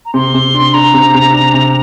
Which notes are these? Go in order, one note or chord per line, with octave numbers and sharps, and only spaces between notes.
A#5
C3 C6
C3
D4
D4 A#5
C3
C3
D4
C3